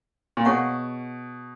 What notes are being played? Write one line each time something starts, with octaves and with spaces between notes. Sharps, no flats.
A#2
B2 G#4 C#5 F#5 C#6